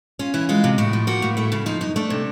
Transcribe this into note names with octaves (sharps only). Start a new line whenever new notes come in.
C#4 F4
E3 E4
G#3 F4
C3
A2 F#4
F3
A#3 F#4
A2
A3 E4
C#3 E4
F3 D#4
F#2 D#4
A3 D4
C3